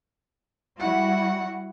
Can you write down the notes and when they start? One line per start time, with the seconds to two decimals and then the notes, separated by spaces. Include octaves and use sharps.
0.80 G3 E4 F#4 F#5